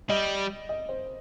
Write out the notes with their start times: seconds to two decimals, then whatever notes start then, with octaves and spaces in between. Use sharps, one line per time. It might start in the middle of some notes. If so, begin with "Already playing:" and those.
0.09 G3 D#5
0.69 D#5
0.89 C5